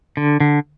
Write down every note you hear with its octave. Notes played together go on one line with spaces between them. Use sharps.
D3
D3